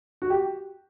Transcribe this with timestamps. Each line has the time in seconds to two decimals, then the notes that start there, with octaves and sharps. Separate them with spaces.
0.22 F#4
0.30 G4